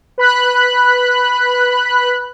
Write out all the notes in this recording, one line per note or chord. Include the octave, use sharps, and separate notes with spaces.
B4 B5 F#6